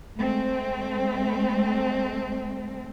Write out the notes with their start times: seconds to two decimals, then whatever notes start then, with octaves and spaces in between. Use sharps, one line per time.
0.18 G#3 A3 C4